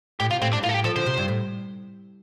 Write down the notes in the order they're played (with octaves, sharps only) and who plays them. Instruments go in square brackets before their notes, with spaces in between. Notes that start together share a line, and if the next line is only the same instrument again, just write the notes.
[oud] A2 [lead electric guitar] G4
[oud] C3 [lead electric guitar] F4
[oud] A2 [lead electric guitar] C4
[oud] G2 [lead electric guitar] D4
[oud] A2 [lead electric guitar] F4
[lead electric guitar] A4
G4
[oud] F3 [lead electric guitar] A4
[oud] D3 [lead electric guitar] C5
[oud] C3
G2
A2